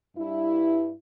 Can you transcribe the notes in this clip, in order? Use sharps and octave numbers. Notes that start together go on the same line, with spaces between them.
G2 E4